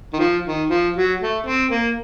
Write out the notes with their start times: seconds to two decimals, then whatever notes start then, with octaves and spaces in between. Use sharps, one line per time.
0.13 D#3
0.19 F3
0.45 D#3
0.70 F3
0.96 F#3
1.20 A3
1.46 C4
1.71 A#3